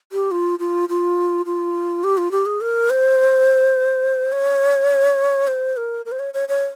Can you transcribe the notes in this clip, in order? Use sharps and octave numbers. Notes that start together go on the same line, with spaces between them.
G4
F4
F4
F4
F4
G4
F4
G4
G#4
A#4
C5
C#5
C5
A#4
A#4
C5
C#5
C#5
C#5